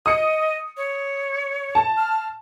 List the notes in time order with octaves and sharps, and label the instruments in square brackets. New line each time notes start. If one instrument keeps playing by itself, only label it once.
[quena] D#5 [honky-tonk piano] D#6 C#7
[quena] C#5
[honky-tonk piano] A5
[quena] F6